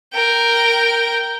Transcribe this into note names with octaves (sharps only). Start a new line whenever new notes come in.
A#4 G5